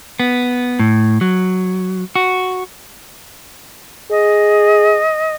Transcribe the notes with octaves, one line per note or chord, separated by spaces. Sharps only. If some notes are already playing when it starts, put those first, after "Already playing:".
B3
A2
F#3
F#4
G#4 D#5